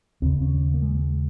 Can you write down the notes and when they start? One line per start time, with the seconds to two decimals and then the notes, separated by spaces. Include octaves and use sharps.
0.22 D#2 C#3 C4
0.41 C#4
0.74 A#3
0.82 G#3